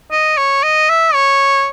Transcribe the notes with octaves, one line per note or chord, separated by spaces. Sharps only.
D#5
C#5
D#5
E5
C#5